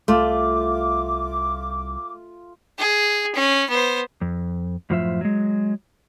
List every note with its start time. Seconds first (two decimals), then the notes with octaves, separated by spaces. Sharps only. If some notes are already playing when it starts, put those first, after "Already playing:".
0.08 C2 A3 F4 D6
2.79 G#4
3.35 C#4
3.70 B3 C5
4.21 F2
4.90 F#2 A2 F3 F4 C5 E5
5.21 F#3 G#3